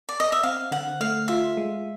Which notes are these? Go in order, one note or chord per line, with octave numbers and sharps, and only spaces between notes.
D5
D#5
E5
C4 F5
D3 F#5
A3 F5
F4 E5
G#3